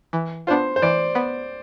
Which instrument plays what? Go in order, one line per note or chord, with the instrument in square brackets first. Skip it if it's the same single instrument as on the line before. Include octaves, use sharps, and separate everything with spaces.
[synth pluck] E3
[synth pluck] B3 D4 F4 [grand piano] C5
[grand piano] C5
[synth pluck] E3 [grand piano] D5
[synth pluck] B3